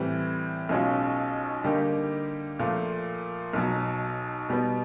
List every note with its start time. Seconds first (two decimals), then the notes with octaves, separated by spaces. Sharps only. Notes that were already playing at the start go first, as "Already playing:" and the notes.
Already playing: A2 E3 G3 C4
0.69 B1 B2 G#3 C#4 F4
1.64 D3 G3 A#3 D#4 G4
2.59 A#2 F3 A3
3.53 B1 B2 F#3
4.49 B2 G3 B3